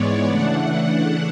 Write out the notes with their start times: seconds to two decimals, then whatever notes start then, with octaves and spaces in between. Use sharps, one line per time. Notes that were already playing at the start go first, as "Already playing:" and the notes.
Already playing: G#2 E3 G#3 B3 C#5 D5
0.26 C#3 E3 A3 D4 F#5
0.73 F#5